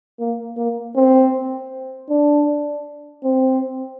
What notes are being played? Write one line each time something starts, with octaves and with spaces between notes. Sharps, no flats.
A#3
A#3
C4
D4
C4